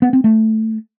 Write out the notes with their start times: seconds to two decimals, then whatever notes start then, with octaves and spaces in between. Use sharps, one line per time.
0.02 B3
0.13 C4
0.24 A3